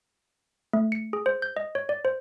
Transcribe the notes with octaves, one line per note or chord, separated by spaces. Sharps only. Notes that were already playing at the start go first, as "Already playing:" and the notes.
A3
C#7
G#4
C5
G6
D#5
C#5
D5
C5